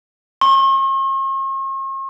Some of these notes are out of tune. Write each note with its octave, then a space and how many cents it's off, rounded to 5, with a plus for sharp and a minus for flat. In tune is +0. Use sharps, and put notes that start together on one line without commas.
C#6 -45